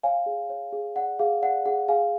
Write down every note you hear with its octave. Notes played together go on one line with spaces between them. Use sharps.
C#5 F5 G#5
G#4
C#5
G#4
D5 F#5
G#4 F5
D5 F#5
G#4 F#5
G#4 F5 G#5